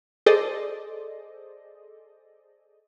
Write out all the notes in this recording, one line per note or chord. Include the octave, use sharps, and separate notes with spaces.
G#4 A4 C5 D5 D#5